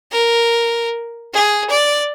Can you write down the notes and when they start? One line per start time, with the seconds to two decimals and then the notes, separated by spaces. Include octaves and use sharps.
0.11 A#4
1.33 G#4
1.69 D5